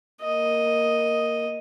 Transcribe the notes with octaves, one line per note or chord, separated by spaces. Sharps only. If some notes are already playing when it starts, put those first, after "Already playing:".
A#3 D#5